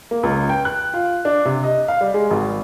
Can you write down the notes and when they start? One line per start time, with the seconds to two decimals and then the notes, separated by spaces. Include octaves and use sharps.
0.11 A#3
0.23 C#2
0.49 G5
0.65 F#6
0.94 F4
1.25 D4
1.45 C3
1.63 D#5
1.88 F5
2.01 G3
2.14 G#3
2.31 G#1